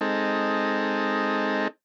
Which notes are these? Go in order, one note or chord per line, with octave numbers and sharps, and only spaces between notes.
G#3 C4 D#4 A4